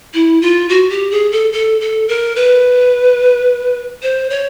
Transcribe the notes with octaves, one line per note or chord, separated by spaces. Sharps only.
E4
F4
F#4
G4
G#4
A4
A4
A4
A#4
B4
C5
C#5